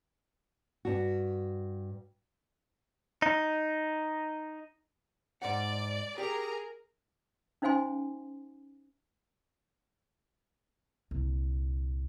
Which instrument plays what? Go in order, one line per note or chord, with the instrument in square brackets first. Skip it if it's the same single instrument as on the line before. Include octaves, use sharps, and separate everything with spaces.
[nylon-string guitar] G2 F#4
[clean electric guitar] D#4
[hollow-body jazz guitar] G#2 F#5 [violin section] D5
[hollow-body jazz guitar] G4 [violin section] G#4 A#4 A#5
[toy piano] C#4 D#4 C5 F5 G#5 C6
[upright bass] C2 A#2